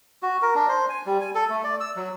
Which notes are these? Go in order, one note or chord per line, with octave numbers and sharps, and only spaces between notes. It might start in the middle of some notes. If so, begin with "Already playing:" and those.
F#4
A#4
D4
C5
G#5
G3
G#5
A4
A3
D5
E6
F#3